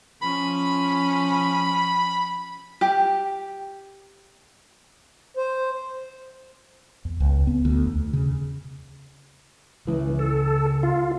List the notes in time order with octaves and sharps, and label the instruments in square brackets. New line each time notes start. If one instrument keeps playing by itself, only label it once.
[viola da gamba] F3 C#4 [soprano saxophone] B5
[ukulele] G4
[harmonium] C5
[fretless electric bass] E2
C#2
B3
D2
E2
C#3
[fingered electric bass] C#3 G#3 [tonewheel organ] E3
[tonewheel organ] A4
F4